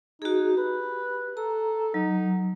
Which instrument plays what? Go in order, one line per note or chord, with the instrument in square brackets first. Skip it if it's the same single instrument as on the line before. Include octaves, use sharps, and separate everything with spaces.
[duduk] D#4 [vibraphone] F#4 G#4
[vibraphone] G4 [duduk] B4
[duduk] A4 [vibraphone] A#5
[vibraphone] F#3 [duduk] D#4